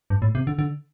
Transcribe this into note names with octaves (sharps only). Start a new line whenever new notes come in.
G2
A2
C3
D3
D3